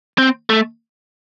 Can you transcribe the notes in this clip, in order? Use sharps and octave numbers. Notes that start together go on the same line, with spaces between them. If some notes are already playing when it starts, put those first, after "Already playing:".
C4
A3